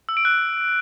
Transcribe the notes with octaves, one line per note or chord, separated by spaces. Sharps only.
E6
D7
F#6